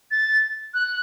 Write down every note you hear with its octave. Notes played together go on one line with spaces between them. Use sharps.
A6
F#6